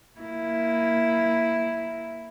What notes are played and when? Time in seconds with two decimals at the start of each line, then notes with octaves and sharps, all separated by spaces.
0.19 A#3 E4